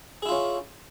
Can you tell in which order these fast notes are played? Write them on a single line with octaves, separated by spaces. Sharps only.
G#4 E4 F4 C#4